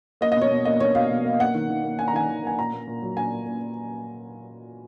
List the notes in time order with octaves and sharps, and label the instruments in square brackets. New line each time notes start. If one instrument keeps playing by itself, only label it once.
[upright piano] A#3 D#5
D#5
B2 C#5
B2
A#3 D#5
A#3 C#5
B2 F5
B2
A#3
A#3 F#5
D#3
D#3
A#3
A#3 G#5
A#5
D#3 G#5
D#3
A#3 G#5
A#2 A#5
A#3
A#2
F#3
A#2 G#5
A#3
A#2